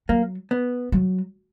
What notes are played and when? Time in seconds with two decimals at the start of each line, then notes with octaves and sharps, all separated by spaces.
0.09 F#3 A#3
0.51 B3
0.92 F#3